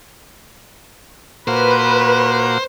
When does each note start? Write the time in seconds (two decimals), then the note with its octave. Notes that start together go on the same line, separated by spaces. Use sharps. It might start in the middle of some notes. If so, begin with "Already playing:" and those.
1.48 A#2 A#3 F#4 B4 C5